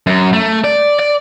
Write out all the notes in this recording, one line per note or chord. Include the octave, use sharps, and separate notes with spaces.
F#2
A3
D5
D5